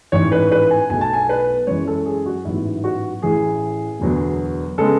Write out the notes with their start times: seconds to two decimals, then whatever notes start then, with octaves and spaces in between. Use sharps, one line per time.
0.12 A1 G#2 E3 C#5
0.32 B4
0.52 B4
0.71 G#5
0.90 B1 B2 A3 G#5
1.01 A5
1.13 G#5
1.29 B4
1.67 F#2 E3 G#3 C#5
1.88 A4
2.06 G#4
2.26 F#4
2.45 A1 G#2 F#3 B3 E4
2.84 F#4
3.22 A1 A2 E3 G#4
4.00 E1 D2 D3 F#3 B3
4.78 C#3 G#3 B3 A4